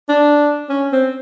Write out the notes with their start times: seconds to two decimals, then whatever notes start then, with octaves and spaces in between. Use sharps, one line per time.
0.09 D4
0.69 C#4
0.92 C4